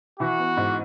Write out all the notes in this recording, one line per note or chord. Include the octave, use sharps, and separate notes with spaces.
E3 F#4
B3
G#2